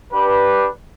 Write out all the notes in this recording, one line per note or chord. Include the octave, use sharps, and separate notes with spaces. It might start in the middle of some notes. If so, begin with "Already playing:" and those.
D4 G4 B4